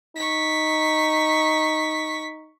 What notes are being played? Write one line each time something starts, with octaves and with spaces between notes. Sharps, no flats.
D#4 C#6 B6